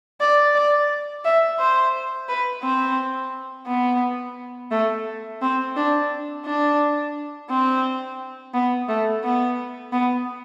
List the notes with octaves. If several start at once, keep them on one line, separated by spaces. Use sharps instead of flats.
D5
D5
E5
C5
B4
C4
B3
A3
C4
D4
D4
C4
B3
A3
B3
B3